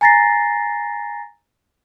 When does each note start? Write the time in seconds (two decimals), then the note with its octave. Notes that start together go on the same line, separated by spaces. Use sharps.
0.01 G#5 A#5 A6 A#6 C7